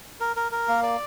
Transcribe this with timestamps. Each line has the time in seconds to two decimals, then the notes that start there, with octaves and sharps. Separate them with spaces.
0.20 A#4
0.36 A#4
0.52 A#4
0.68 A#3
0.83 D5